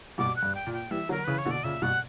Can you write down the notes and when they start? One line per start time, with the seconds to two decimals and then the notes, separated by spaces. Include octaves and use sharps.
0.18 G2 B2 D6
0.36 F#6
0.43 G2
0.55 G5
0.67 A#2
0.73 G5
0.91 E3 G3 E5
1.09 D3 F#3 A#4
1.24 C#3 E3 B4
1.38 C#5
1.45 B2 D3
1.51 D5
1.64 A#2 C#3 E5
1.82 G2 B2 F#5